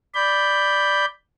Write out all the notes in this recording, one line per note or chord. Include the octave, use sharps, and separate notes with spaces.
D5 B5 G6